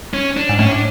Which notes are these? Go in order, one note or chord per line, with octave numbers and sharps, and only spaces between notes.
C#4
D4
G#2
A2 C#4
D4